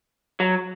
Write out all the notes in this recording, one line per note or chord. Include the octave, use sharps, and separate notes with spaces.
F#3